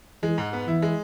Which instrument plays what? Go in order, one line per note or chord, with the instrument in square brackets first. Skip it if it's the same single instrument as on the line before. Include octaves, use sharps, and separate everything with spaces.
[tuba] E3 [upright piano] G#3
[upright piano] G#2
B3
[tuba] E3 [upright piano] E4
[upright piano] G#3